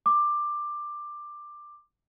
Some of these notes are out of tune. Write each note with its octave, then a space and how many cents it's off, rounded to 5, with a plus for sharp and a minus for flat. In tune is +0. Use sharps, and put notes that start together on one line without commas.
D6 +15